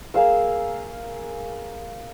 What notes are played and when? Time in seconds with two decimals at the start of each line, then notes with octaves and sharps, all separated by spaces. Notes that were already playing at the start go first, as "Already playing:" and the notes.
0.14 A#3 G#4 F5 E6